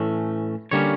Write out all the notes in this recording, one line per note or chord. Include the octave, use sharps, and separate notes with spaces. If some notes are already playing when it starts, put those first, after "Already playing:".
Already playing: A2 E3 A3 C#4
D3 G3 A#3 C#4 C#5